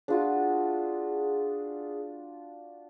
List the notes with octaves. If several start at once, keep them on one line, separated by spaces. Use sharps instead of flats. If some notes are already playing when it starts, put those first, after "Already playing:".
D4 F4 F#4 G#4